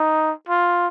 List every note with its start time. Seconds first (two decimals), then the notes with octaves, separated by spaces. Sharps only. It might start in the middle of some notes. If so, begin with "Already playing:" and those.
Already playing: D#4
0.49 F4